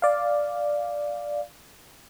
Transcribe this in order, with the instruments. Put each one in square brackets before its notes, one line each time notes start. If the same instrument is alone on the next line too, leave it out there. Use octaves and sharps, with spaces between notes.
[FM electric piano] D5 F5